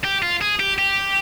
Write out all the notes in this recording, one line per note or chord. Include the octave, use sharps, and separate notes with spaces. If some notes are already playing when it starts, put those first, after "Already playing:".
G4
F4
G#4
G4
G4